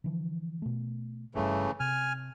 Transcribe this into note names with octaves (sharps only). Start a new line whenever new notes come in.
D3 E3 F3
B2 A3
G1 G2 C#3 E3 A3
C3 G#5 F6